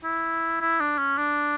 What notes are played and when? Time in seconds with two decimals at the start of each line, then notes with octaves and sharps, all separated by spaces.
0.04 E4
0.61 E4
0.80 D4
0.98 C#4
1.18 D4